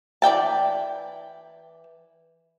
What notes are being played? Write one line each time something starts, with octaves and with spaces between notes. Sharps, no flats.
E3 D5 G5 A5